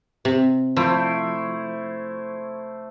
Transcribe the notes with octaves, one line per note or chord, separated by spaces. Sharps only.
C3
F3 A3 E4 C5